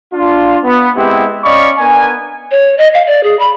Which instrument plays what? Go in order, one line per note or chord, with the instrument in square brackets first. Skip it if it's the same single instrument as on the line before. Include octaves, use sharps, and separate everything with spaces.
[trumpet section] D4 F4
B3
G#3 B3 C4 E4 G4
C#4 D5 D#5 F5 B5 C#6
B3 D4 A#4 G#5
[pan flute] C#5
D#5
F5
D5
G#4
B5